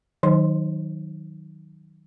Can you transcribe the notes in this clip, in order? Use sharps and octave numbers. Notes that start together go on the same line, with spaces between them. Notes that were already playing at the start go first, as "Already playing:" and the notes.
D#3 F#3 D#4 C5 C6